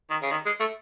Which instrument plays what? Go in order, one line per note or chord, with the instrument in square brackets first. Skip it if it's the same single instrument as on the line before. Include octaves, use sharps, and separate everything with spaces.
[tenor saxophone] D#3
C#3
D#3
G#3
A3